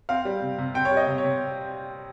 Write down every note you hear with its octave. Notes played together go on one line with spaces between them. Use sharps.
C4 F5
G3
C3
C3
C4 G5
C#5
G3
D#5
C3
C#5
C3